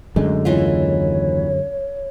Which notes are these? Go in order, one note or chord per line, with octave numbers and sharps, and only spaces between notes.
F#2 D3 G#3 A3
D#2 E3 F4 C#5